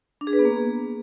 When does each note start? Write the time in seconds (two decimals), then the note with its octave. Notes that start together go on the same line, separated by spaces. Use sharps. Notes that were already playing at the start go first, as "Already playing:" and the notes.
0.21 D4
0.27 G#4
0.33 B4
0.39 B3
0.45 A#3